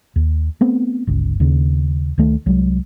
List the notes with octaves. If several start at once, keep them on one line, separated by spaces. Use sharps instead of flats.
D#2
A3 B3 C4
G1 C#2
D#2 C#3
D2 D#3 A3
C2 F#3 G#3